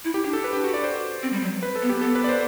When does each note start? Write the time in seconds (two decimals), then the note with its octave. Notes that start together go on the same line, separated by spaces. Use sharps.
0.05 E4
0.14 G4
0.24 D4 G4
0.33 A4
0.44 B4
0.53 G4
0.64 F#4
0.74 D5
0.84 C5
1.23 C4
1.33 G3
1.42 F#3
1.63 B4
1.76 A4
1.82 B3
1.89 G4
2.01 B3 A4
2.15 B4
2.24 D5
2.29 C5